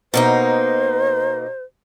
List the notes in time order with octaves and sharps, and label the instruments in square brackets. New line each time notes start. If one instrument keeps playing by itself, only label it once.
[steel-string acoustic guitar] B2 A#3 D#4 [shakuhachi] C5